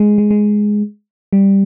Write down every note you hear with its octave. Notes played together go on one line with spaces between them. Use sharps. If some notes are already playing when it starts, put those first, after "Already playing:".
Already playing: G#3
G#3
G#3
G3